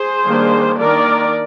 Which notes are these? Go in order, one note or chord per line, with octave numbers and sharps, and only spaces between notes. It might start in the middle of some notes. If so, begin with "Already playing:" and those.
Already playing: G#4 C5
D#3 G3 A#3 D4
D#3 A#3 D4 A#4 D5